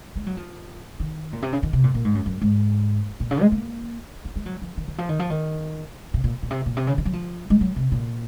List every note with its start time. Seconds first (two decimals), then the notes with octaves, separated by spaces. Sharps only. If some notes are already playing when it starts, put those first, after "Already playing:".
0.16 G#3
0.26 F#3
0.37 F3
1.00 D#3
1.33 A#2
1.42 C3
1.53 C#3
1.63 D#3
1.73 C3
1.84 A#2
1.95 A#2
2.05 G#2
2.15 F#2
2.26 F#2
2.42 G#2
3.20 A#2
3.31 C#3
3.41 G#3
3.52 A#3
4.25 A#3
4.36 G#3
4.46 F#3
4.62 F3
4.77 D#3
4.88 D#3
4.98 F3
5.09 D#3
5.19 F3
5.30 D#3
6.14 C3
6.24 A#2
6.43 A#2
6.51 C3
6.66 A#2
6.77 C3
6.87 C#3
6.98 D#3
7.05 F#3
7.13 F3
7.50 G#3
7.61 F#3
7.76 C3
7.92 A#2